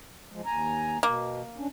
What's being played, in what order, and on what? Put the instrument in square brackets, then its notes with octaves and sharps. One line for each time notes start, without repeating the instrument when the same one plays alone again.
[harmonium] F3 G#3
D#2 G#5 A#5
[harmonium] B2 [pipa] A#3
[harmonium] C#4 D4